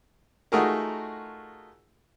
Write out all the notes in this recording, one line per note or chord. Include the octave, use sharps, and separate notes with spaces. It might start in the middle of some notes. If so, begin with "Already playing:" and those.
A3 D#4 F4 F#4 G#4 A#4